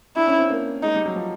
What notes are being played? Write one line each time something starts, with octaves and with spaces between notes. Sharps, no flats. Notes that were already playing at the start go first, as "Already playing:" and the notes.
D4 E4
C#4
C4
A#3
G#3 D#4
G3
F#3
F3